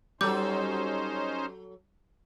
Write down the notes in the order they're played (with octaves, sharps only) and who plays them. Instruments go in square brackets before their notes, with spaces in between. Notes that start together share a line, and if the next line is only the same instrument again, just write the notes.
[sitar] F#3 A4 [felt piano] G3 [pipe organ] C#4 D#4 C5 [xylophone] D6 G6